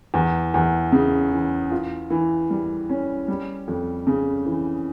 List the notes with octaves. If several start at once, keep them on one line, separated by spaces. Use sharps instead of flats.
E2
E2
C#3
E3
F4
E3
G3
C#4
G3
F2
C#3
E3